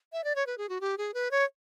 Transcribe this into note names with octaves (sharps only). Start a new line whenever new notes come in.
E5
D5
C#5
B4
G#4
F#4
G4
G#4
B4
C#5